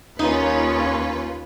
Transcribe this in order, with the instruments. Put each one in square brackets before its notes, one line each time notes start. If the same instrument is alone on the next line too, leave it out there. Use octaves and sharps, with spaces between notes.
[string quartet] D#2 C#4 [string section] A#3 F4 B4 [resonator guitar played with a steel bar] D#4